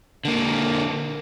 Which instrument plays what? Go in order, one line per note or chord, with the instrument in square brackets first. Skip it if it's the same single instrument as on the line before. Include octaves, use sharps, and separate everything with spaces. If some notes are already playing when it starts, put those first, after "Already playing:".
[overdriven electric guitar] D3 A#3